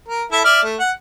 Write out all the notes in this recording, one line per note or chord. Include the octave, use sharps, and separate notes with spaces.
A#4
E4 A4 E5
D5 E5 F6
A3
F#5